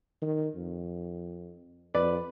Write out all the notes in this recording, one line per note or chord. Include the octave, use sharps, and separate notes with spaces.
D#3
F2
F2 B4 D5